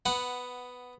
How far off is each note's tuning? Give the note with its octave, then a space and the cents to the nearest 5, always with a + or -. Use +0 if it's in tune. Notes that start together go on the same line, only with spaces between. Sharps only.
B3 +5 F#5 +0